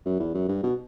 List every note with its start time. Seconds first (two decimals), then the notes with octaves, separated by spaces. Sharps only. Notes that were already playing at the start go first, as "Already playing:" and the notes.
0.06 F#2
0.19 E2
0.34 F#2
0.48 G2
0.63 B2